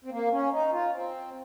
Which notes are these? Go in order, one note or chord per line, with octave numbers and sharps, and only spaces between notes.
C4
A#3
C#4
D#4
F4
C4